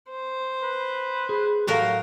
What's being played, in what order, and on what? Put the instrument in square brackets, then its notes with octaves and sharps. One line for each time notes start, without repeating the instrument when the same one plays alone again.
[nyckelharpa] C5
[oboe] B4
[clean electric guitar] G#4
[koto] A2 F#3 A#4 [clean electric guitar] G4 F5